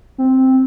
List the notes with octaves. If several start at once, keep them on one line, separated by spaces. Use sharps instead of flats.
C4